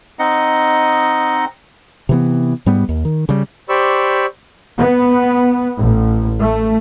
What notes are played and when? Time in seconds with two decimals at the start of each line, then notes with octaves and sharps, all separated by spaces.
0.19 C4 D#4 D#5 F#5
2.09 C3 E3 B3
2.66 G#2 G3 B3
2.89 D#2
3.05 D#3
3.29 C#3 G3
3.69 G4 C5 D5 B5 C#6 E6
4.79 B3
5.77 A1
6.40 A3